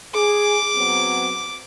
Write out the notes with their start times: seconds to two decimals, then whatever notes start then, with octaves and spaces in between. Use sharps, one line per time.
0.14 G#4 D6
0.75 F#3 B3 C4